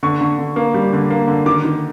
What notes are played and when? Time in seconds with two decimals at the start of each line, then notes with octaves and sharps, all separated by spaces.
0.03 D3 C#6
0.21 D3
0.39 D3
0.56 A#3
0.74 G3
0.93 D3
1.10 A#3
1.28 D3
1.46 D#3 D6
1.65 D#3